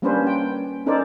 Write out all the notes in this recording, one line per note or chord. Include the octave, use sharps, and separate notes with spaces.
G3 A#3 C#4 D4 B4 C5
G5
C#4 D#4 A4 A#4 C5 D5